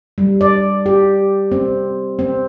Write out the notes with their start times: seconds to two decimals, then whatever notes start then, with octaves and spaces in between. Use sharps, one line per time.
0.18 G3
0.41 D5
0.86 G4
1.52 C4
2.19 C4